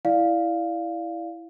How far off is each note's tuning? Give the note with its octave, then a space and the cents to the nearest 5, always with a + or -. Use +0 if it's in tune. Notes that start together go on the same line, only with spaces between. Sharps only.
E4 +0 D5 +0 F5 +0